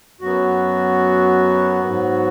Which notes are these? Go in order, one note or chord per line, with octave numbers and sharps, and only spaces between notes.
F#2 F#3 B3 F#4
G#2 F#3 B3